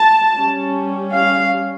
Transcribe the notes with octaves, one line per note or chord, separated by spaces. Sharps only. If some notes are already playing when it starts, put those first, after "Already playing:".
Already playing: A5
G3 C#4
F5